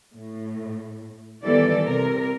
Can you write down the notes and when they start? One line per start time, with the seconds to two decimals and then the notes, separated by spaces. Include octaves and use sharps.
0.15 A2
1.43 D#3 E3 G3 B3 A4 D5
1.84 C3 A#4